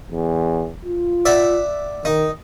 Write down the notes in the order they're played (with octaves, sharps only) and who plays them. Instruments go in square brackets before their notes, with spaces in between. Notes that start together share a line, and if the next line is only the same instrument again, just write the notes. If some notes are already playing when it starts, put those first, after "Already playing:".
[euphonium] E2
F4
[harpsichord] D5 E5 F#5
[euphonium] D#3 [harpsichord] D#4